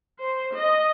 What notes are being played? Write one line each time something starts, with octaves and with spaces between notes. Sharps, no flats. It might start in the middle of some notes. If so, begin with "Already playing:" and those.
C5
D#5